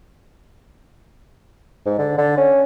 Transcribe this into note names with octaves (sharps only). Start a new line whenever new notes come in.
G#2
D3
D3
C#4